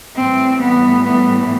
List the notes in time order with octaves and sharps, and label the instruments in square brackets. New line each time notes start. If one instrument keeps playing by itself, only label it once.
[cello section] A2 E3 G3 [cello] C4
[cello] B3
B3